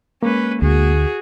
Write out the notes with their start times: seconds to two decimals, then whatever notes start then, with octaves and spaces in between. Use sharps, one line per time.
0.23 G#3 A#3 C#4 B4
0.62 D2 F#4 G#4